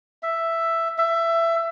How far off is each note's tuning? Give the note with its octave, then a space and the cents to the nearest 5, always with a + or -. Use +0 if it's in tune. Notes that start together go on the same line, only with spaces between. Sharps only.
E5 +5
E5 +20